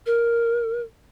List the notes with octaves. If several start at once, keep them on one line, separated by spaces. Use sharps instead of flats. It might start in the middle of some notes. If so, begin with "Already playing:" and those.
A#4